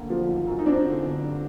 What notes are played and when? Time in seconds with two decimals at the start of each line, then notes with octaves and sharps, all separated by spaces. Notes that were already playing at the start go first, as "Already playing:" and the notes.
Already playing: D2 D3 A#3
0.10 F3
0.28 G#1
0.47 F#2
0.59 D#4
0.66 F#3 C4 D4
0.86 D3
1.04 G1
1.22 G2